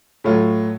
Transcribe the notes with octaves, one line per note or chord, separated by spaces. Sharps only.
A2 F#3 A3 F4